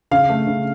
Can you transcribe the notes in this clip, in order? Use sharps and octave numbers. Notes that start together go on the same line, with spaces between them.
C#3 F5
A3
C#3